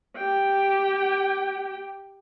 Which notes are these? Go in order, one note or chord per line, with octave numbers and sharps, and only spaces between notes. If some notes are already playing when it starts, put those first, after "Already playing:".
G4 G5